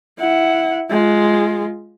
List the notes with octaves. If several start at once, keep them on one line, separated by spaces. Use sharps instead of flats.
E4 F#5
G#3 F4